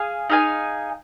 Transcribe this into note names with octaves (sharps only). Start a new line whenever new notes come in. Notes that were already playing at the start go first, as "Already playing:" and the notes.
Already playing: G#4 F5 G#5
D#4 G#4 F5 G#5